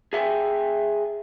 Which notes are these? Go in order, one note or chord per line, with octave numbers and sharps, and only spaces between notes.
G#4 E5 F5 G5 G#5